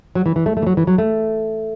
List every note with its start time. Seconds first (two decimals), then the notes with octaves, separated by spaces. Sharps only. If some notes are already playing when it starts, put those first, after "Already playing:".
0.15 F#3
0.26 E3
0.36 E3
0.46 A3
0.57 A3
0.62 E3
0.67 F#3
0.77 E3
0.87 F#3
0.98 A3